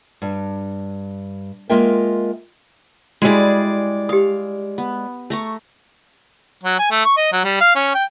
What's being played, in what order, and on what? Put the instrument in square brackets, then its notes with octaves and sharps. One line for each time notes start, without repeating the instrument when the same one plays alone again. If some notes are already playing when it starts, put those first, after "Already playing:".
[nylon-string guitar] G2
G#3 A#3 F4 A#4 E5 G5
[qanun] G3 E4 G#4 [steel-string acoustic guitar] G#3 D5 [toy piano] F#4
[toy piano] G4 D#6 [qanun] F5
[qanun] B3
A3 A#5 C#6
[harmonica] F#3
G#5
A3
C#6
D#5
F#3
G3
F5
C#4
G5